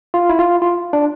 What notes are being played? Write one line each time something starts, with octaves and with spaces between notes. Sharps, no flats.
F4
E4
F4
F4
D4